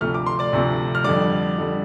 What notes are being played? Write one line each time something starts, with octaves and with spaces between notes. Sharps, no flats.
D2 C3 F3 A3 F6
D6
C6
D5 D6
D2 C3 F3 A3
F6
F2 D3 G3 D5 D6
F2 D3 G3